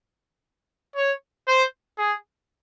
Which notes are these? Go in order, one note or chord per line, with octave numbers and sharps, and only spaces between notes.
C#5
C5
G#4